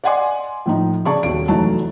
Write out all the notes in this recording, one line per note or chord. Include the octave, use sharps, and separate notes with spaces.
D5 D#5 F#5 G#5 C6 D6
A2 F3 D#4
C#3 G#4 D5 A5 A#5 C#6
D#1 B1 D7
F1 E3 F#3 A3 D#4 A5